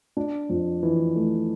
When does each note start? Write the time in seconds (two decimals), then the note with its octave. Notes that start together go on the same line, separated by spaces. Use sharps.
0.17 D4
0.49 F2
0.83 E3
1.16 A3